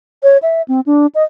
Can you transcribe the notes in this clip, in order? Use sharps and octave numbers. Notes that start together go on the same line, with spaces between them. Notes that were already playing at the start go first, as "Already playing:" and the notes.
C#5
E5
C4
D4
D#5